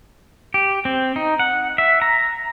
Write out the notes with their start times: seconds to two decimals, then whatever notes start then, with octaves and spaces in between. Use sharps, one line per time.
0.54 G4
0.85 C4
1.16 D#4
1.39 F#5
1.78 E5
2.02 A#5